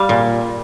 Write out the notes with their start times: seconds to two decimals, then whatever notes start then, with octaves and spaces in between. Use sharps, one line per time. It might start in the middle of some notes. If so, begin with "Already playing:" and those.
Already playing: G3 F5
0.09 A#2